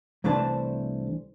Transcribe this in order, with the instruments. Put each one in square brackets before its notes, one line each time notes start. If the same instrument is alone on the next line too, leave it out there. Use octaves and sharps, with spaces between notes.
[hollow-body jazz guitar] C2 E3 A3 D4 C5 A5